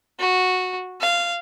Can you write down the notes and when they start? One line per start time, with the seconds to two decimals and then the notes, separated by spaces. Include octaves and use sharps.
0.20 F#4
1.01 F5